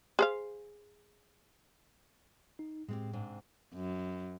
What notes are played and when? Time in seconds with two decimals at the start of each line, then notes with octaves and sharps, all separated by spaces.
0.19 G#4 C5 F5
2.59 D#4
2.88 A2 G#3 C4 G4
3.13 G#2 C3 D4
3.74 F#2